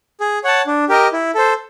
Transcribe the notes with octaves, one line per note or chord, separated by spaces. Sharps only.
G#4
C#5 F#5 A5
D4
G4 A#4 D#5
E4
A4 C5